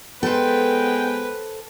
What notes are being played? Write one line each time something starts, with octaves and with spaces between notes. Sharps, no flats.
G#3 B3 A4 B4 C5 G5